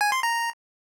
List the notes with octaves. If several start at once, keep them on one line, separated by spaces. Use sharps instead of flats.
G#5
C6
A#5